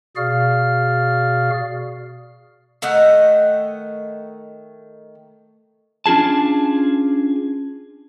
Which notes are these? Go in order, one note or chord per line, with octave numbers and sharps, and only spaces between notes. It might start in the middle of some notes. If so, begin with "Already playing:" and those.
B2 F#4 G#4 D5 F5 F6
D#3 A3 D#5 F#5
C#4 D4 F4 G#4 A5